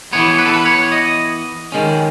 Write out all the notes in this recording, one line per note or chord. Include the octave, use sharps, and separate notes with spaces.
E3 B3 C#5
B4
A4
B4
C#5
D#5
D#3 G#3 C#4